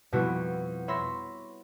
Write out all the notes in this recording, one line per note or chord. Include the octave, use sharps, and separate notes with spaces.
F2 B2 G3 E4 F#4
C#5 E5 B5 C6 E6 A#6